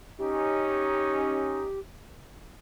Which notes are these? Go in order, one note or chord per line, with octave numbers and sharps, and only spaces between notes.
C#4 D#4 G4